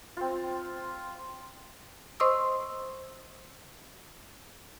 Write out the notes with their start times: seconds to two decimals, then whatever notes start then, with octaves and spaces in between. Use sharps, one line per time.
0.17 C4 F4
2.20 C5 D#5 C6 C#6 D#6 E6